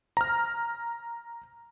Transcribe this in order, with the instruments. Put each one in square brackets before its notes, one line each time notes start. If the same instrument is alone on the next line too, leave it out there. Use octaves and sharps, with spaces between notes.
[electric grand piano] A#5 F6